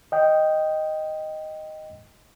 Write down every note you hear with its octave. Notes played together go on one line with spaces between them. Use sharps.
D#5 G5